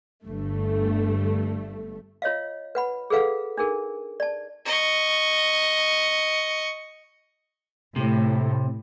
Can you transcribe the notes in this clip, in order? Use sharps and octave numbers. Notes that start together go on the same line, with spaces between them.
G1 G2 A3
F4 C#5 D#5 F5
B4 F#5 B5
G#4 A4 B4 F5 F#5
D4 D#4 G#4 A#4
D5 A5
D#5 C#6
A2 C3